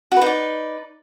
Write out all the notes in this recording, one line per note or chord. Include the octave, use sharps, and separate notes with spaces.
D#4 F#4 B4 D5